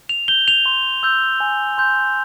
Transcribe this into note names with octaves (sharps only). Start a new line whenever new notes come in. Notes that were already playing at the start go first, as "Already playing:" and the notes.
F7
G6 G7
F7
C6
E6 G6
G#5
C6 G6